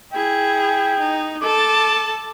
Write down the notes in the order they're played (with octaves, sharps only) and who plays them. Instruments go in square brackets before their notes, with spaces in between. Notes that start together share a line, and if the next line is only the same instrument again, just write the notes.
[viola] E4 G#4 [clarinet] G5
[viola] D#4
[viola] A4 A5 [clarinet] D6